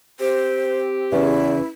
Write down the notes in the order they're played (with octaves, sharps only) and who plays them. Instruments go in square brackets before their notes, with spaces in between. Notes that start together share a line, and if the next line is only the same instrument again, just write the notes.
[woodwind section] C4 G4 [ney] C5
[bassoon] E2 [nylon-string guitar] C#3 E3 [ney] E4